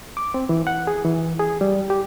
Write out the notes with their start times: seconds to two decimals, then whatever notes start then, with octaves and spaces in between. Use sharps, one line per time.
0.17 D6
0.34 C4
0.49 E3
0.67 F#5
0.87 G#4
1.05 E3
1.39 G#4
1.61 G3
1.90 G4